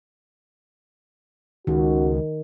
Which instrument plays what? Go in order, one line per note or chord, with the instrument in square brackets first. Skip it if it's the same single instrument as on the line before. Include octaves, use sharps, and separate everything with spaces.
[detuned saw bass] C#2 [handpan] D#3 [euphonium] F#4